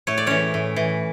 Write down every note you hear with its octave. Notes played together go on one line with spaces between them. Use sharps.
A2 C#5
D5
E3 C#4 C#5
A2
E3